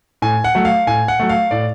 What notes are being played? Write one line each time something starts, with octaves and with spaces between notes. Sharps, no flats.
A2 G#5
F#5
F#3 A3
F5
A2 G#5
F#5
F#3 A3
F5
A2 D5